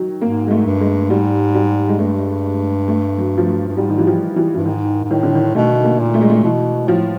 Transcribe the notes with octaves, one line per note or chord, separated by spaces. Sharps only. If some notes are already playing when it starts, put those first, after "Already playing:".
Already playing: D#3 F#3
G#2 A#3
G#3
A3
G2
G#3
G#2 G3
G3
G#3
G2 A3
A3
F#3
F3
F#3
G2
G#2 G3
D#3
E3
F3
E3
G2 E3
G#2 D#3
G#2
A2 D#3
D3
D#3
B2 A3
A#3
A#2
A3
G#3
A3
B2 E3
A2 F3